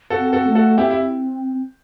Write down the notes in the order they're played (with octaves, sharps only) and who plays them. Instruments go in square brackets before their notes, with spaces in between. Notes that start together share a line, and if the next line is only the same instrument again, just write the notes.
[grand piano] F#4 A4
[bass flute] C4
[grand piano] F#4 A4
[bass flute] A3
[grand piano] F#4 A4
[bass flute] C4 [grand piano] E4 G4
[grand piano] E4